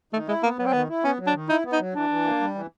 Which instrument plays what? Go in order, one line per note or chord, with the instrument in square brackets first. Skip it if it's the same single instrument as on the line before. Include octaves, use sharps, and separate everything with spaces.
[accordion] D#3 [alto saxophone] A3
[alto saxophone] G#3 [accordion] E4
[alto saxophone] A#3 [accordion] B3
[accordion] F#3 [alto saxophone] B3
[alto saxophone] C4
[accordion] D#3 [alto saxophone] B3
[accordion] E4
[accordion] B3 [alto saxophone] C#4
[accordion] F#3
[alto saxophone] D4
[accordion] D#3
[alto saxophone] D#4 [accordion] E4
[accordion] B3
[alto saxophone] D#4
[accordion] F#3
[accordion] E3 [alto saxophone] D4
[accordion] E3
A#3
G3
E3